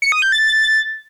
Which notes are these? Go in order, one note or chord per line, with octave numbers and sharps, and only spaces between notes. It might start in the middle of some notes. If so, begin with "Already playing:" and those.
C#7
D#6
G6
A6